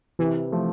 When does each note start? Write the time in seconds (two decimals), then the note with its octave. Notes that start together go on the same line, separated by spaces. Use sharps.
0.19 C3 E3
0.52 F3 A3